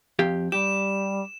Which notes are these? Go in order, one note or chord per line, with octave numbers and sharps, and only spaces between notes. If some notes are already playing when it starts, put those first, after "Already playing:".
F2 G4 F5
G3 G4 E7